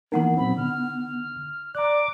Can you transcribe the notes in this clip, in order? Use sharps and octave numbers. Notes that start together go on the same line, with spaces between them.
E3 A#3 B3 D#4 A#4 F#5 C6
A#2 F#3 C4 B5
D3 F6
D5 A#5 D6 F#6